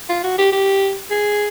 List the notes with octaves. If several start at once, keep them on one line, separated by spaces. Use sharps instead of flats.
F4
F#4
G4
G4
G#4